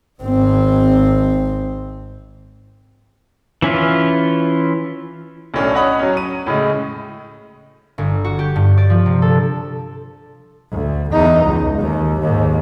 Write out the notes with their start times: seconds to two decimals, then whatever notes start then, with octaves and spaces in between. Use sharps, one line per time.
0.22 G#1 C4
3.62 E3 C#4 E4 F4
5.54 B1 A2 C#4 D4 A4
5.74 C#5 D#5 F#5 B5 D#6
5.99 F#3 C#4
6.17 D#7
6.47 A2 C#3 G#3
7.98 G1
8.24 F#4
8.39 G4
8.56 G2
8.77 D5
8.90 F3
9.06 C3
9.22 A4
10.71 D2
11.11 E2 D#4
11.45 C#2
11.79 D#2
12.21 D#2 G#2